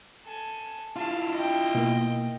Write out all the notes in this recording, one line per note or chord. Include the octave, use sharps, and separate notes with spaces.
A4 G#5
E4 F4 F5 A5
D#5 G5
B2 A#3